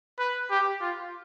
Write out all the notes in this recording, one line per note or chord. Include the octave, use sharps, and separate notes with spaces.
B4
G4
F4